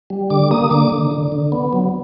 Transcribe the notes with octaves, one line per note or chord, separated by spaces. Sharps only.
G3
D3 D6
A#3 D#6
D3 D6
D3
D3
D3
B3
F#3